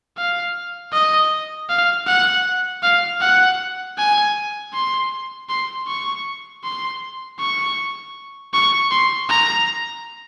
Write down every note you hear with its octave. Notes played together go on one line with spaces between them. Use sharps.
F5
D#5
F5
F#5
F5
F#5
G#5
C6
C6
C#6
C6
C#6
C#6
C6
A#5